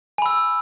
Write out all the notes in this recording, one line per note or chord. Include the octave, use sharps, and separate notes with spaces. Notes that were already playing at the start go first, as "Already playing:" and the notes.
G#5 B5 E6